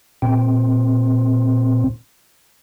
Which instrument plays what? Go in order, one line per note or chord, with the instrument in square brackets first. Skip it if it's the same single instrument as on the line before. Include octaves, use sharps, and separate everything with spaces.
[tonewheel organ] A#2 C4